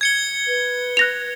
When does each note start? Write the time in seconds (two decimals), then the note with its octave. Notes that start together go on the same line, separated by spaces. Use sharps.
0.01 G#6 C#7 G7
0.47 B4
0.97 F#6 A#6 F7